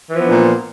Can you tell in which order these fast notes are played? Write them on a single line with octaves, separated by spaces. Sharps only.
E3 F3 B3 D4 A#2